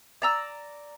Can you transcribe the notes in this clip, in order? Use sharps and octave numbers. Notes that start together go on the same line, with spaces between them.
D5 A#5 E6